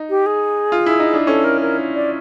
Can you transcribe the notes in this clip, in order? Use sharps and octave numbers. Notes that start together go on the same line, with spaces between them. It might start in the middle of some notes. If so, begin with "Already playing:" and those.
Already playing: D#4
G4
G#4
F4
E4
D#4
D4
C#4 A4
A#4
A#4
D5